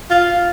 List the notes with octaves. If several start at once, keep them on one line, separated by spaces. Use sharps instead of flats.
F4